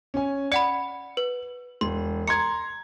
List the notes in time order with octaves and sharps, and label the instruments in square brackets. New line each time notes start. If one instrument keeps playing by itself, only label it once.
[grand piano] C#4 G#5
[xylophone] D5 F#5 B5 [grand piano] C#7
[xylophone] B4
[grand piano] E1 [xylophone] C6
[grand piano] A#5 C6 G#6 [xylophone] C#7